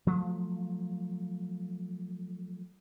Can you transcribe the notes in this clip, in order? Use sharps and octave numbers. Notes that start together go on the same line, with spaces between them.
F3 F#3 A3